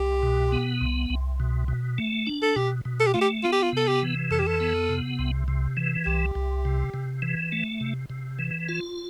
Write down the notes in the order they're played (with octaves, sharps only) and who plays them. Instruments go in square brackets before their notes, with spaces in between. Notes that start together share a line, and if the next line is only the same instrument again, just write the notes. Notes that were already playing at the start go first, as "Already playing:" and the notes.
Already playing: [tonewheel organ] C2 [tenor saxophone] G4
[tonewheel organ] B2
B3
C2
C2
B2
B2
A3
D4
[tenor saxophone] A4
[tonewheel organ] B2 [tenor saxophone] G4
[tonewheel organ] B2
[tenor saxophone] A4
G4
[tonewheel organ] A3 [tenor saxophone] F4
[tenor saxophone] G4
[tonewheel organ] B3 [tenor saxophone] F4
[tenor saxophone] G4
F4
[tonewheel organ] C3 [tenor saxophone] A4
[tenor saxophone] G4
[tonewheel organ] E3
[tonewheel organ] F2 [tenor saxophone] A4
[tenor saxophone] G4
A4
[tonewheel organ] B3
C3
C2
C3
E3
[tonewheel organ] C2 [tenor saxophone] G4
[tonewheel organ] C2
C3
C3
E3
A3
C3
C3
E3
F4